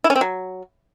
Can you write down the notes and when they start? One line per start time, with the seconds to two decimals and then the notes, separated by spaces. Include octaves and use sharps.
0.04 E4
0.10 C#4
0.16 C4
0.21 F#3